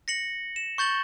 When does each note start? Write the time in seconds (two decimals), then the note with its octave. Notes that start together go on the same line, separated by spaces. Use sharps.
0.08 A#6 C#7 F#7
0.56 E7
0.78 C#6 G6 A6 F#7 G7